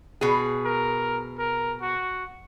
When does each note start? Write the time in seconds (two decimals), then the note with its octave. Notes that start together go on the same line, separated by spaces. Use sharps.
0.21 B2 G#4
0.65 A#4
1.38 A#4
1.81 F#4